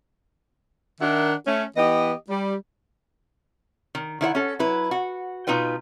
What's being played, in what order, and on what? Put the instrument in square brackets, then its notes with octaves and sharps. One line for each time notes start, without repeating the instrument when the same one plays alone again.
[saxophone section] D#3 D4 A#4 E5 F#5
A3 C#4
E3 B3 G4 D#5
G3
[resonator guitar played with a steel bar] D#3
D#3 E4 C5 F#5
C#4 A4
F#3 E4 B4
F#4
B2 D#4 F4 B4 G5